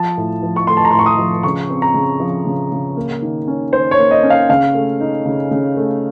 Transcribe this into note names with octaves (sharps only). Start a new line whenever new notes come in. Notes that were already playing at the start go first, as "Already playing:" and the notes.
Already playing: F3 A5
A2
F3
C#6
A3 C6
A5
A#5
A2 C6
C#6
D#6
F3
C#3 C#6
C4
A#5
C#3
F3
C#3
C#3
A#3
D#3
C#4
D#3 C5
C#5
A#3
D#5
C#4
F5
C#3 F5
A3
D#4
C#3
C#3
A3